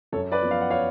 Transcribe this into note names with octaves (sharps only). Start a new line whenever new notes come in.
F#2 A4 C#5
B4 D5
F3 B3
F5
F#5
C#5 F5